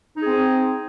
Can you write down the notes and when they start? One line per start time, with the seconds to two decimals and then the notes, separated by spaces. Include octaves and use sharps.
0.16 D#4
0.21 G#4
0.25 C4